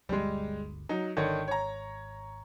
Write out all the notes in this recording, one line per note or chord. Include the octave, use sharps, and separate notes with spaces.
G1 D2 G3 G#3
F#3 D#4
G#1 D3 D#3 C#5
C#5 A#5